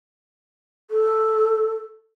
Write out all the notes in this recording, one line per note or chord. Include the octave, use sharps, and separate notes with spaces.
A4